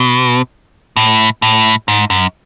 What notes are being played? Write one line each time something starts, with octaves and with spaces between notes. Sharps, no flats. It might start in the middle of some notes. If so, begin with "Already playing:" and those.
Already playing: B2
A2
A2
G#2
F#2